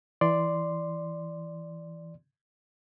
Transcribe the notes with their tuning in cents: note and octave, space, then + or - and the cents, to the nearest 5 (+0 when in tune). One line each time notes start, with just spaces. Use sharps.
E3 +0 D5 +0 C6 -5